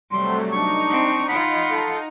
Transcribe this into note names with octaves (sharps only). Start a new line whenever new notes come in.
C3 F#3 G3 A3 C6
D4 D#4 C#6
C4
F4 F#5 B5
A4